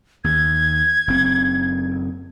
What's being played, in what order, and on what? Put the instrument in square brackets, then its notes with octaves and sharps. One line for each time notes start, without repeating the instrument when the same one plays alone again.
[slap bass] D#2 [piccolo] G#6
[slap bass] F#1 C4